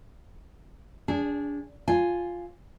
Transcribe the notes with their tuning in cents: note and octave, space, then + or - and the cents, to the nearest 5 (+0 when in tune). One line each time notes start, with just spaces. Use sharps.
D4 -30 G#4 -20
F4 +0 G#5 +0